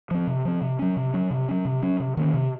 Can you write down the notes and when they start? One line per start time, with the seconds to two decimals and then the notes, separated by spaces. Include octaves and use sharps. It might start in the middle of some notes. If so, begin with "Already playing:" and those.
0.11 F3 C4
0.27 C3
0.45 F3 C4
0.61 C3
0.79 F#3 C#4
0.97 C3
1.13 F#3 C#4
1.31 C3
1.48 F#3 C#4
1.65 C3
1.82 F#3 C#4
2.00 C3
2.17 D#3 A#3 C#4
2.34 C3